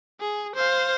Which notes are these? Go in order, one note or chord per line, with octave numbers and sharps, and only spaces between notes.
G#4
C5 F5